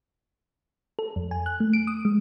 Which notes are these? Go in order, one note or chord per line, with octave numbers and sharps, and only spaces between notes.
A4
F2
G#5
F#6
A3
D7
D#6
G#3